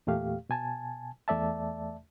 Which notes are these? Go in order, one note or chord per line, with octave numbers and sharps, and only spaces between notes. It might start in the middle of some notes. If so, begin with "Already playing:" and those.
E2 A#2 A3 G4 F5
B2 G#5 A5
E2 A3 D5 E5 A5